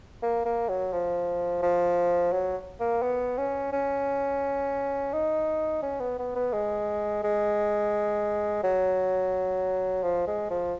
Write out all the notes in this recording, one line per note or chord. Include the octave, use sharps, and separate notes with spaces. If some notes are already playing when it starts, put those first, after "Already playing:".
A#3
A#3
F#3
F3
F3
F#3
A#3
B3
C#4
C#4
D#4
C#4
B3
B3
B3
G#3
G#3
F#3
F3
G#3
F3